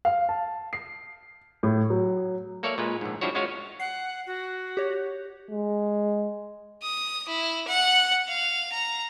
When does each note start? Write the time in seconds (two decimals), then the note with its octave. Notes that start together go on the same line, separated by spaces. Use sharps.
0.05 F5
0.29 A5
0.73 C7
1.63 A2
1.90 F#3
2.63 A#3 A4 C#5 D5 E5 F5
2.78 A#2 G#3 B4
3.01 A#1 G#2
3.21 F3 G3 D4 E4 F#4 C#5
3.35 G#3 C#4 F4 F#4 C#5 F5
3.80 F#5 C7
4.26 F#4
4.77 G4 C#5
5.51 G#3
6.83 D#6
7.28 E4
7.67 F#5
8.28 F5
8.72 A#5